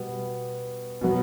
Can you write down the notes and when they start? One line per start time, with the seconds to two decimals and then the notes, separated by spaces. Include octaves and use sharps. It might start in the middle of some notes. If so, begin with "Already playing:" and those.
Already playing: B2 G3 B3
1.01 B2 F#3 B3